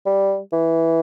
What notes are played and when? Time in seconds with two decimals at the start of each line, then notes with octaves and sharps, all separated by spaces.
0.06 G3
0.52 E3